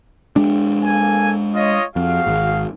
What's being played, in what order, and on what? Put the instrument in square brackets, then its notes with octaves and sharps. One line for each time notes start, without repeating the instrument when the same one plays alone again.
[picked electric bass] G#3 D4
[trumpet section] A#3 A4 G#5
F4 C#5 D#5
[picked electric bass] F2 [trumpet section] F#4 G#4 F5
[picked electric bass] G#1